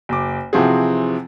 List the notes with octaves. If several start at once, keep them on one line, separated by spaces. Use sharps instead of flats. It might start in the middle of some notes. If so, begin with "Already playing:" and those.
F#1 D6
C3 E3 F3 C4 F#4 G#4